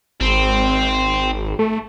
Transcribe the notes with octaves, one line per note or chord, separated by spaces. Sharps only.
G#1 C4
A3